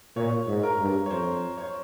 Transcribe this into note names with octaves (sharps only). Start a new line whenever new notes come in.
A#2 C#5
G#2
A#4
G2
C#5
F2 C5
C#5